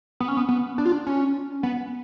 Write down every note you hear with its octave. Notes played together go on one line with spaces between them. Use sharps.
B3
C#4
B3
B3
D4
F4
D4
C#4
B3